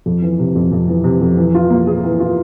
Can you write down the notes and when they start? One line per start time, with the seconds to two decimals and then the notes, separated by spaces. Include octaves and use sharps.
0.06 F2
0.22 E3
0.39 C3
0.55 F2
0.72 F2
0.88 E3
1.04 C3
1.21 F2
1.37 E3
1.54 F4
1.70 A#3
1.87 G#4
2.04 E3
2.20 F4